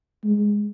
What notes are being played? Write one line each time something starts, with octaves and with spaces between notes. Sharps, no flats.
G#3